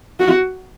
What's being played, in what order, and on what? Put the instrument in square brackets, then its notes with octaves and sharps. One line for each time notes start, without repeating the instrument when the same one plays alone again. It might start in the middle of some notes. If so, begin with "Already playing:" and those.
[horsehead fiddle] F#4